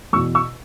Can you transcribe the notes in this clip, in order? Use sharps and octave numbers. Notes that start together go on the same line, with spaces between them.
E2 B2 C#6 E6
C#6 E6